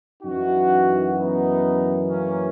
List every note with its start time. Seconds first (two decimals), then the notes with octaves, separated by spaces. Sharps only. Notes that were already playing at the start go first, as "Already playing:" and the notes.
0.23 F#2 E3 D#4 F#4
1.16 B3 D#4
2.08 A#3 C#4